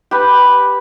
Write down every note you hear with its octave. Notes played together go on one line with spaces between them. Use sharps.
G4 B4